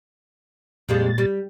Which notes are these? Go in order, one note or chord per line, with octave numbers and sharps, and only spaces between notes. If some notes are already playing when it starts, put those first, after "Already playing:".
F2 A#2 G3 G#3 A6
G3